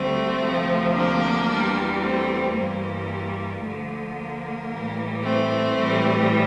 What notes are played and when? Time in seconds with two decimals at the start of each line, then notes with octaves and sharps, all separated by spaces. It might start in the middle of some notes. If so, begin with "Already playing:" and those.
Already playing: D2 D3 G3 A3 C4
0.39 D2 C3 F3
0.94 A#3 D4
1.47 E2 E3 G3
2.01 A3 C4
2.54 G2 E3 G3 A#3
3.62 D2 D3 F3 A3
4.16 A#3
4.69 A2 E3 G3
5.23 A3 C4
5.76 A2 E3 G3